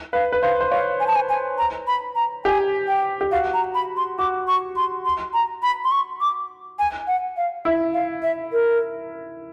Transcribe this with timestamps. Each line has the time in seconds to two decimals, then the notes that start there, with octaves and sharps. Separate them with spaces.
0.13 B4 F5
0.32 B4
0.42 C5 F5
0.61 C5
0.71 C#5 F5
1.00 G#5
1.07 A5
1.15 G#5
1.30 G#5
1.58 A#5
1.87 B5
2.15 A#5
2.45 G4 G#5
2.88 G5
3.21 G4
3.31 F#4 F5
3.54 A#5
3.74 B5
3.97 C6
4.19 F#4 D6
4.47 C#6
4.76 C6
5.05 C6
5.34 A#5
5.63 B5
5.84 C6
5.92 C#6
6.21 D6
6.79 G#5
7.07 F#5
7.37 F5
7.65 E4 E5
7.94 F5
8.23 E5
8.53 A#4